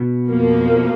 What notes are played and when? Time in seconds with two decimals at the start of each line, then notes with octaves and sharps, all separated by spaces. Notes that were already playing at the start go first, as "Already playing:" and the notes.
Already playing: B2
0.28 F2 F3 A#3